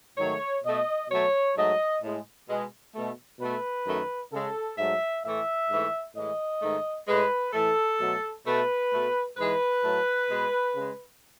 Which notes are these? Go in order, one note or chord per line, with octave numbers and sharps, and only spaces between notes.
G#2 D#3 F#3 A3 C#5
B2 A3 D#5
B2 F#3 A3 C#5
G#2 F#3 A3 D#5
A2 G#3
B2 G#3
B2 A3
B2 A3 B4
F#2 D#3 A3
C#3 G#3 A4
G#2 F#3 A3 E5
A2 E3 A3 E5
G#2 E3 A3
A2 E3 G#3 D#5
G#2 D#3 A3
A2 G#3 B4
A2 E3 A3 A4
B2 F#3 A3
B2 A3 B4
B2 A3
G#2 E3 G#3 B4
A2 F#3 A3
B2 G#3
C#3 G#3